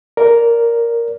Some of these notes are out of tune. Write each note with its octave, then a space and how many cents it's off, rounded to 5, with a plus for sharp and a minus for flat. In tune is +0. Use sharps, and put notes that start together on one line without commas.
A#4 +0 D5 -20